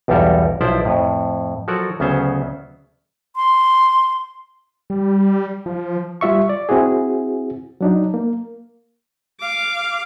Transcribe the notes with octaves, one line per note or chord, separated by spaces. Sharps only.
B1 E2 G2 G3 A4 A#4
B1 F3 E4 C5 D5
F2 A2
F3 F#3 F#4 A4 A#4 D5
D2 C#3 F#3 B3 C#4 C5
C6
G3
F3
G3 F4 E5 C#6
D5
C4 E4 F#4 G#4
F#3 D4 D#4
A#3
F5 D6